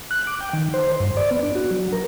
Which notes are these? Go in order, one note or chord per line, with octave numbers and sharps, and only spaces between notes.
F#6
D6
G5
D#3
C5
G2
D5
B3
D4
F#4
F#3
A#4